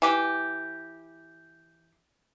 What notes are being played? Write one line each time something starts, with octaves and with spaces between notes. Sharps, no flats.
E3 G4